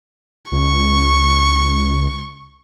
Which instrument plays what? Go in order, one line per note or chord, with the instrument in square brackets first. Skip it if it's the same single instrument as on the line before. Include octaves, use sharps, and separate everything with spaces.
[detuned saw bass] C#2 [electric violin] C#6